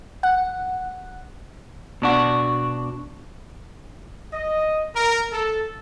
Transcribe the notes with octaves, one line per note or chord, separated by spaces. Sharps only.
F#5
B2 D4 F#4
D#5
A#4
A4